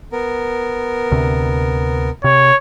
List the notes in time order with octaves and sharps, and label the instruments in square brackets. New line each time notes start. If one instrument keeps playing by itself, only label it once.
[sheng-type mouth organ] B3 A#4
[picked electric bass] D2 C3
[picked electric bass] C3 [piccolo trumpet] C#5